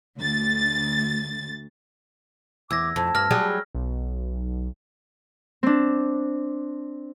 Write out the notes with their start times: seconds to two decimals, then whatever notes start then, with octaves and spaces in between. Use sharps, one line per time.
0.16 D2 A6
2.71 E2 D6 E6 G#6 A#6
2.96 F2 A5
3.15 G2 F6 A#6
3.31 F#3 G3 G#4
3.75 B1
5.63 C4 D4